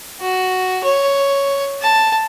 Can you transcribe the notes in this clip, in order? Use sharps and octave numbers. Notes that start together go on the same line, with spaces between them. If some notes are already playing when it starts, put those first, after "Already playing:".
F#4
C#5
A5